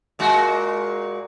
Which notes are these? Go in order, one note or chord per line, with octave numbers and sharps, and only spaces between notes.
A#2 G#3 F#4